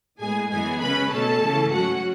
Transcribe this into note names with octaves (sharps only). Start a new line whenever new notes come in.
A2 G#3 B3 G#4 G#5
F#2 E3 G#3 B3 G#4 G#5
C#3 G#3 C#4 B4 B5
B2 A3 C#4 A4 A5
C#3 E3 A3 C#4
G#2 F#3 C#4 F#4 F#5